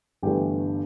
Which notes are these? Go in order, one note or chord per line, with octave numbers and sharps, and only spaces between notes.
G1 G2 E3 A3 G4